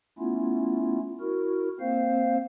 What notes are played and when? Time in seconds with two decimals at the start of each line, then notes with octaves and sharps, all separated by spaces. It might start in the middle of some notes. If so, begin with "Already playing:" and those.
0.19 A3 B3 C#4 E4 F4
1.20 E4 F#4 A#4
1.80 A#3 C4 C5 F5